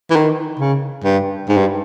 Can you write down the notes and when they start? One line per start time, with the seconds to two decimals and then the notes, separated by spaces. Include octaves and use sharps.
0.10 E3
0.16 D#3
0.60 C#3
1.04 G2
1.49 G#2
1.57 G2